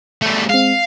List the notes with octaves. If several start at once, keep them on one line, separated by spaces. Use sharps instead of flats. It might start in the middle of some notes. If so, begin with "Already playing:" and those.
G3 A3
G#3 C4 F5